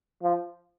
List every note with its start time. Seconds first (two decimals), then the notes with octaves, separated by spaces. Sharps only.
0.23 F3